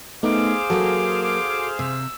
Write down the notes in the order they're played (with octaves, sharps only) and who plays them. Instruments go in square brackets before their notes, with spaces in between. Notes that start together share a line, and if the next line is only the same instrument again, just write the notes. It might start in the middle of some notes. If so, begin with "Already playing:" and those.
[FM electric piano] A3 B3 D#4 [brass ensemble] G#4 C5 F5 [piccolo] D6
[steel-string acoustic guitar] F#3 A#3 [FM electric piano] F#4 A4
[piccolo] D6
[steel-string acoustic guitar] C3 [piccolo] E6